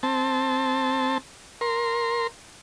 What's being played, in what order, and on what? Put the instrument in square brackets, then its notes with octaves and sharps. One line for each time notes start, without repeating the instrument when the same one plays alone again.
[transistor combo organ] C4 A5
A#4 C6